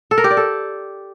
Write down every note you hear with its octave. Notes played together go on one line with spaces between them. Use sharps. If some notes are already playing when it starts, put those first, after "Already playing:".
A4
A#4
G4
D5
A4